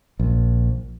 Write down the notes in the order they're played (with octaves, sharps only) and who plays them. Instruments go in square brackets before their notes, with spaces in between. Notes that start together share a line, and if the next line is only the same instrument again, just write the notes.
[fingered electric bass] A#1